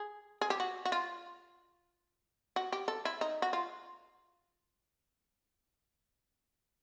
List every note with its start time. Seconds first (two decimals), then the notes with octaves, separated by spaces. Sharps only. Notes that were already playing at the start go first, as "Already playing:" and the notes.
Already playing: G#4
0.41 G#4
0.50 G4
0.60 F#4
0.85 F#4
0.92 F4
2.56 F#4
2.72 G4
2.88 A4
3.05 E4
3.21 D#4
3.42 F#4
3.53 F4